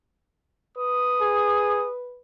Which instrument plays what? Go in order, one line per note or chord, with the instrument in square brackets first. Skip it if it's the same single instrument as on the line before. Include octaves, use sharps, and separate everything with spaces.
[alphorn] B4 [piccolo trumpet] D#6
[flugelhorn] G#4